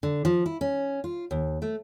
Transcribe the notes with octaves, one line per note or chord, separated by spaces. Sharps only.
D3
F3
E4
C#4
F4
D#2
A3